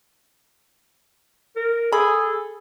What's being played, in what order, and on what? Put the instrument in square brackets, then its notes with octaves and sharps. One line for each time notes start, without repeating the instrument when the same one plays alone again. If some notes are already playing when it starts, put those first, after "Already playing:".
[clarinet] A#4
[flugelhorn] G#4 [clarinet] A4 [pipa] B5